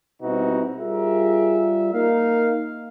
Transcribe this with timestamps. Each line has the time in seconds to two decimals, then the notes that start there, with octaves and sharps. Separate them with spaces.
0.22 B2 G3 C4 D#4 E4 F#4
0.78 G3 F4 G#4 A#4 E5
1.94 A#3 D#4 F5